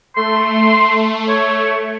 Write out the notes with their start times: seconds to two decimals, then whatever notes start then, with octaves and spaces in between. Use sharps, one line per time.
0.16 A3 C6
1.28 C#5